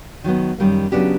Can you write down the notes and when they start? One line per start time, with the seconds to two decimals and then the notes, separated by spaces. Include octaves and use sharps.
0.24 D#3 F#3 B3
0.58 F#2 D#3 G3 A#3
0.92 C#3 F#3 B3 D4 G4